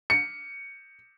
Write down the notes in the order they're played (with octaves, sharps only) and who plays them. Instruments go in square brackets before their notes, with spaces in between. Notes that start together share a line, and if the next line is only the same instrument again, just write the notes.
[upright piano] C#7